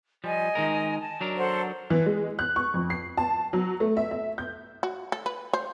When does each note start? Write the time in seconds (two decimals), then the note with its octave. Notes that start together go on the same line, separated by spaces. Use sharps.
0.24 F3 G3 D#5 G#5
0.55 D#3 G#3 A#4
1.00 A5
1.21 F#3 D4 A#4
1.37 A4 C5 F#5
1.90 E3
2.06 G#3
2.39 F#6
2.56 C#6
2.74 F2
2.90 C7
3.17 A5
3.53 F#3
3.80 A3
3.97 E5
4.11 E5
4.38 G6
4.83 F#4
5.12 A4
5.26 B4
5.53 C5